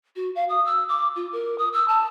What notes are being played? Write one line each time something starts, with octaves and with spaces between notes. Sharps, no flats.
F#4
F5
D#6
E6
D6
F4
A#4
D#6
E6
A5